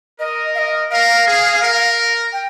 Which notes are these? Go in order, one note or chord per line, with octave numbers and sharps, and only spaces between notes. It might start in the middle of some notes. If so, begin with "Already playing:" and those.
A#4 D#5
F5
D#5
A#4 F5
G#4
A#4
G5